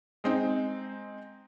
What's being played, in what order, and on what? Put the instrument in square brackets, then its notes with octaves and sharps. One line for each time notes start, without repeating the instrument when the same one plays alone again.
[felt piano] G#3 C4 D#4